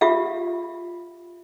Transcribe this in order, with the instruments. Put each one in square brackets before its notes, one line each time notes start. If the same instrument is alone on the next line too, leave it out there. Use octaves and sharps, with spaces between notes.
[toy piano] F4 G4 E5 F5